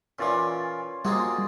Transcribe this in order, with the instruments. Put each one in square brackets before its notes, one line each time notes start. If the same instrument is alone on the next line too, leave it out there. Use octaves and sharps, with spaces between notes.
[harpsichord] A#2 E3 [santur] C#4 F4 D5
[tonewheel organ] G3 [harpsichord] G#3 C4 F#4 [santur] A#3 F4 G#4